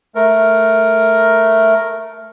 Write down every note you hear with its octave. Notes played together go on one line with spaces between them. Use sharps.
A3 A#4